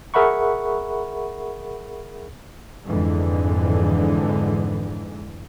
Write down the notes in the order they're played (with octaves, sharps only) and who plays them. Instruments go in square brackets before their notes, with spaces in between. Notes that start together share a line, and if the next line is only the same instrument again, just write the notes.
[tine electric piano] G#4 A#4 E5 F#5 B5 C#6
[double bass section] F2 G#2 D3 E3 G#3